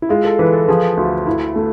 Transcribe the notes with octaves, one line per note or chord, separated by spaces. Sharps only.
E4
G#3 F4
A4
E3 B4
A4
F3 G#4
D2
E4
A3